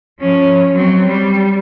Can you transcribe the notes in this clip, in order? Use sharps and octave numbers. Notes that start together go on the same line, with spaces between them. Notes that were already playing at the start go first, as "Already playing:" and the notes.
F3 C#4
F#3 C4
G3